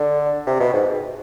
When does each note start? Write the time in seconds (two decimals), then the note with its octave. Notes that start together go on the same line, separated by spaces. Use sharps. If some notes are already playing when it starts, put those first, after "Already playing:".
Already playing: D3
0.47 C3
0.60 B2
0.74 G#2